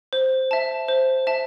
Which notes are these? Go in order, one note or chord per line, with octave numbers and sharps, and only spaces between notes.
C5
E5 A5
C5
E5 A5